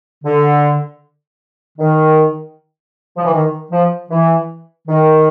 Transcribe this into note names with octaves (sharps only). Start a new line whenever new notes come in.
D3
D#3
F3
E3
D#3
F3
E3
D#3